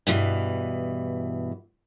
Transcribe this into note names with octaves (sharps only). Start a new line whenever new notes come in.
G2 B2 E3